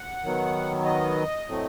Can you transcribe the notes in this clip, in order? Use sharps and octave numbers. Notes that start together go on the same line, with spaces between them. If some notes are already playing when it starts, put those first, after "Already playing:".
Already playing: F#5
D#3 F#3 B3
D#5
A2 F#3 A3 C4